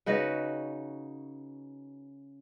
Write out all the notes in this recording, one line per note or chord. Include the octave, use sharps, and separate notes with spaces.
C#3 D#4 F#4 B4